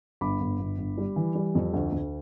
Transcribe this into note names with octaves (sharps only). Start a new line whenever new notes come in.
G1 B5 D6
G1
G1
G1
G3
E3
G3
F2
D2
D2